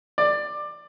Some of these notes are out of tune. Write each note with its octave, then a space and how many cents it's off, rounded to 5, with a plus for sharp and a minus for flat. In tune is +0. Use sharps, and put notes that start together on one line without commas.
D5 +15